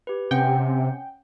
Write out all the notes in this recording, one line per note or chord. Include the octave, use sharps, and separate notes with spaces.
G4 B4
C3 C#4 F#5 G5